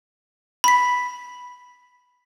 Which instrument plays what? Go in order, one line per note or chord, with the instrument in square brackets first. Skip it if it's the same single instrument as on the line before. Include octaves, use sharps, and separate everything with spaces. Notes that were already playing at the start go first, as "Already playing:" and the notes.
[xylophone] B5 B6